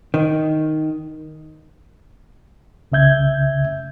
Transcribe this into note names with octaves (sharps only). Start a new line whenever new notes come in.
D#3
C2 C#3 E5 G6 G#6